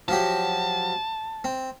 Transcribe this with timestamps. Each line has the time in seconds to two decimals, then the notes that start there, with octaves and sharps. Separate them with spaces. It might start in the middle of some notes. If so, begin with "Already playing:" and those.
0.08 F3 F#3 G4 A5
1.44 C4